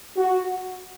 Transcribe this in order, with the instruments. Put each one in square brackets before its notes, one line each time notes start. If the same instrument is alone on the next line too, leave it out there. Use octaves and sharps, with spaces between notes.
[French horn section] F#4